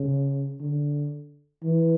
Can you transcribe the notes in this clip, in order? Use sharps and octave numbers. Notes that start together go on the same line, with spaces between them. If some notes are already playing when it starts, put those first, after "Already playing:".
Already playing: C#3
D3
E3